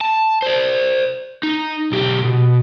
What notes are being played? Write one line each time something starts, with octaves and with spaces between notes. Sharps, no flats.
A5
C5 D5
D#4
B1 G4
B2